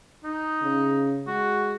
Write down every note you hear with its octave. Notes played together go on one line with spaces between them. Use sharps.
D#4
C#3
G#3 F#4